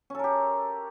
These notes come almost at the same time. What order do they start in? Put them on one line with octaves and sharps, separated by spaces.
C#4 A4 A#4 G4